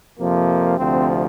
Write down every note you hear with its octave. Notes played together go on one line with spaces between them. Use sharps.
F2 C3 F3 A#3
D2 C3 F3 C4